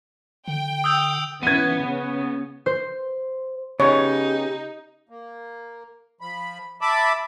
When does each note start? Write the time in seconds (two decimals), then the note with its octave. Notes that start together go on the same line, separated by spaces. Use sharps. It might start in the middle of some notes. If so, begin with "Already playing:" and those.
0.48 D3 G5
0.84 D#6 E6 G6
1.43 E3 B3 C#4 G#6 D#7
1.79 C#3 C#4
2.66 C5
3.80 C#3 B3 D#4 G4 C#5
5.09 A#3
6.21 F3 B5
6.81 E5 A5 B5 D6